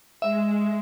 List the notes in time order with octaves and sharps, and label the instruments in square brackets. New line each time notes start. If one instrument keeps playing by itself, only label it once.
[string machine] G#3 [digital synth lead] E5